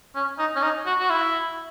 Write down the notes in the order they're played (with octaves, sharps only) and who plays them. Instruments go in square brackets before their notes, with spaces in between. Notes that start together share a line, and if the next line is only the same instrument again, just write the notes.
[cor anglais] C#4
D#4
C#4
D#4
F#4
F#4
E4